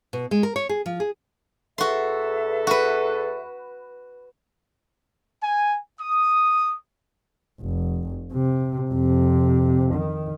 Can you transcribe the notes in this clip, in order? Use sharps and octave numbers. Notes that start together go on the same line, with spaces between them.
B2
G#3
A#4
C#5
G#4
F3
G#4
E2 F#4 A4 E5 C6
F#4 B4
G#5
D#6
F1
C3
F2 C3
D#3